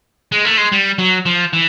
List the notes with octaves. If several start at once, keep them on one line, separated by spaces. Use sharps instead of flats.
G#3
A3
G#3
G3
F#3
F3
E3